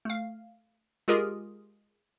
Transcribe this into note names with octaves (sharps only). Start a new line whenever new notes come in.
A3 F5
G#3 F4 G4 G#4 A#4 D#5